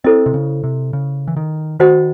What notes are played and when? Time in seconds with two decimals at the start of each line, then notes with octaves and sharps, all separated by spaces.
0.04 C4 E4 A4 C5 D#5
0.26 C3
0.34 C#3
0.63 C3
0.93 C#3
1.28 E3
1.37 D#3
1.79 D#3 F#4 C5 D#5 F#5